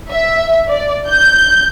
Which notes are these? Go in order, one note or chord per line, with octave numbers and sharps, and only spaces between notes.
E5
D5
G6